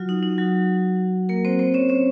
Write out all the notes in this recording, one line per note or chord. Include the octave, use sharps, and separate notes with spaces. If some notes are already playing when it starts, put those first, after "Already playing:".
Already playing: F#3 F4 F#4
D#4
D#4
F#3 F#4
A#3 A#4
C4 C5
C4 C5
C#4 C#5
C#4 C#5